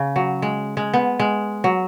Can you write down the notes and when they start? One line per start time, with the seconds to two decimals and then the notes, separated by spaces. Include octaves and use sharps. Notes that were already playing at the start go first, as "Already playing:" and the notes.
Already playing: C#3
0.16 F#3
0.42 G#3
0.77 G#3
0.94 B3
1.20 G#3
1.64 F#3